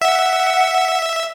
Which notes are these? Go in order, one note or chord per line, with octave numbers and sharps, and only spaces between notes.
E5 F#5